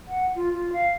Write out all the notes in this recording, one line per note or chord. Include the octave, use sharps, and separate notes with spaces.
F#5
F4
F4
F5